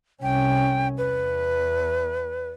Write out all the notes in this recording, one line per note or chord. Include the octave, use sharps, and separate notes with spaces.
C2 C#4 G5
E2 B4